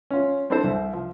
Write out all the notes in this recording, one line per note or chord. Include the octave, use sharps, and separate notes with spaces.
C#4 F4
C4 D4 E4 A4 C5
C2
F3